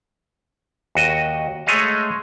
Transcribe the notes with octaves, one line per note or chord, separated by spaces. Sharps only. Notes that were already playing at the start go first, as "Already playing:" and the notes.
D#2 F#4 D#5
G#3 A3 G#4 C#5 D#5 F5